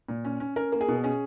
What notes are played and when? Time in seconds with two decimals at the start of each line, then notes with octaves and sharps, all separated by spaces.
0.09 A#2
0.25 C#4
0.40 C#4
0.56 C#4 A#4
0.72 A#3
0.81 G#4
0.88 B2
1.04 C#4 G#4